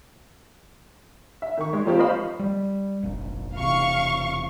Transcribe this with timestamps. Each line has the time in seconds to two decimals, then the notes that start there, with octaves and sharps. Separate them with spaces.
1.42 E5
1.57 D#3 C#6
1.73 G#3
1.85 F3 A#3 C4 F4 G4
1.99 C5 D#5 F5 B5 C#6
2.39 G3
3.03 F1 A#1
3.55 E1 E2 C3 F5 C#6